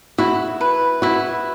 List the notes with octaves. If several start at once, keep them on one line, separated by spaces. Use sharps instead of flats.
E4 F#4
B4
E4 F#4